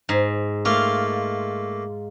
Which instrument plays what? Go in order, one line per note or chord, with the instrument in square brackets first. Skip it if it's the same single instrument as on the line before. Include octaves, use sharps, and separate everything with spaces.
[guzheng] G#2
[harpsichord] A3 A#3 [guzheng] F4